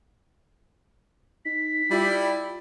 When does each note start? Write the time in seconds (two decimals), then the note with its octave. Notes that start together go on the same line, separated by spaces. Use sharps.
1.45 D#4 B6
1.91 G3 E4 F4